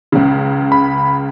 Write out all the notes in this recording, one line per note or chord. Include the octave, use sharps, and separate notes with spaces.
C#2 C#3
B5